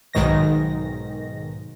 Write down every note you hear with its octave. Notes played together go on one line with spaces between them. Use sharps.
B1 G#2 D#3 A#6